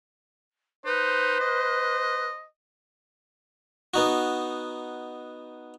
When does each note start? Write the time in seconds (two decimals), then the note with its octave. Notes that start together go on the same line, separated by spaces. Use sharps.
0.85 D#4 B4 C5
1.40 D#5
3.94 B3 D#4 F#4